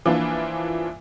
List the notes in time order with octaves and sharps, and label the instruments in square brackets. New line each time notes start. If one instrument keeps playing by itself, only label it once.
[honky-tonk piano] E3 F3 A#3 D4 F4 B4